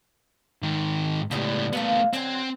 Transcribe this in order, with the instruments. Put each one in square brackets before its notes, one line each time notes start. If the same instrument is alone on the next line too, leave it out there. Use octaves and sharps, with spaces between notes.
[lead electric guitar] G#2 D#3
[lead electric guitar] C#2 A2 [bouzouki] D3 G3 B3
[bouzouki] A#2 D3 F5 [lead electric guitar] A3 B3
[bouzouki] D3 F#3 G#5 [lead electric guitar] C4